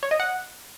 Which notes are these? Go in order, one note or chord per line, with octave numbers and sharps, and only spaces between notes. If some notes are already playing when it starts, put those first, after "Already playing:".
C#5
D#5
F#5